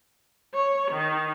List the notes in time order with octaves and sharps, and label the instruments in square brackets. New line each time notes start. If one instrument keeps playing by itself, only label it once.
[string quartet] C#5
D#3